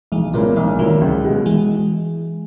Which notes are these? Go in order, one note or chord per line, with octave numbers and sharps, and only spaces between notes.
B1 E3 G#3
A#2 G#3 A#3 B3 C#4 E4
B1 E3 G#3
A#2 D#3 F#3 A#3 C#4 E4
C#2
B2 G#3
E3 G#3